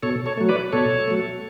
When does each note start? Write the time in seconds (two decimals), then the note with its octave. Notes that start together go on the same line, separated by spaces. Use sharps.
0.03 B2 A4 C#5
0.26 A4 C#5
0.38 F#3 A3
0.49 B4 D5
0.73 B2 A4 C#5
1.08 F#3 A3